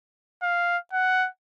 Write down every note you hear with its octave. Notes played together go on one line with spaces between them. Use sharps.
F5
F#5